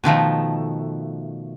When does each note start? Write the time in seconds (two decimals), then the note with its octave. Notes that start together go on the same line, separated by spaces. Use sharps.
0.04 B2 D#3 F3 A3